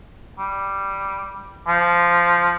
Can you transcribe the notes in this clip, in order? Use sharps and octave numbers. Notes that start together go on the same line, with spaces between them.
G3
F3